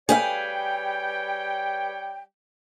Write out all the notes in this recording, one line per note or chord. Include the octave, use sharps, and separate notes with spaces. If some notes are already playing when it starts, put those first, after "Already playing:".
G3 G#4 B4 C#5 F5 G5